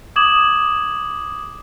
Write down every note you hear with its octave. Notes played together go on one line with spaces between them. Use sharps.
D6 D#6 G#6 E7 F#7